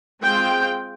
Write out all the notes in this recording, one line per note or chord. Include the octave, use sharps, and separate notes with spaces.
G#3 C4 F4 G5